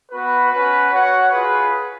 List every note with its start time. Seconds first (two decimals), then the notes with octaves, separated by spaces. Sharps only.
0.11 B3 F#4 B4
0.52 C#4 F#4 B4
0.91 F#4 C#5 F#5
1.30 F4 G#4 B4